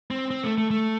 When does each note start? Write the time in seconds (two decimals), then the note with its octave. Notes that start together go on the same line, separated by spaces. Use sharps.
0.11 C4
0.31 C4
0.44 A3
0.58 A3
0.71 A3